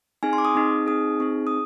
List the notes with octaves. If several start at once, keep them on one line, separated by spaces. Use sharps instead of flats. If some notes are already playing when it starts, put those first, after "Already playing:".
C4 D#4 G#4 G#5
C6
D6
D#6
C4 D#4 G#4
C4 D#4 G#4 D#6
C4 D#4 G#4
D#6